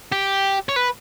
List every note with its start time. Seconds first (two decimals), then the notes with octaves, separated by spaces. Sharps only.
0.12 G4
0.69 C#5
0.76 B4